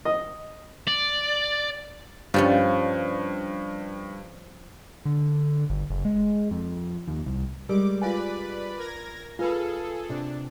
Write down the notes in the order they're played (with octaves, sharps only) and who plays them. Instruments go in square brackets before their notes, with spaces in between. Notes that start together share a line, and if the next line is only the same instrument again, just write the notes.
[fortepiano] D#5
[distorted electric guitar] D5
[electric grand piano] G2 [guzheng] F3 G3 C#4
[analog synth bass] D3
G1
F#1
G#3
F2
D#2
C2
[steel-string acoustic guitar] G3 G#3 [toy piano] A#4 [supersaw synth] D6
[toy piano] F4 F5 G#5 [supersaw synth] B4 D5 B5
[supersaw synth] A#4 G#6 A#6
[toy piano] F4 B4 B5 [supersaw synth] G#4 A4 [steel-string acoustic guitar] F5
[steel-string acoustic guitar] C3 [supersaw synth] D4